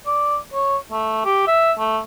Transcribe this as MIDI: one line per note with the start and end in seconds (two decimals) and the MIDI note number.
0.06 0.37 74
0.54 0.77 73
0.92 1.21 57
1.25 1.47 67
1.47 1.72 76
1.79 1.99 57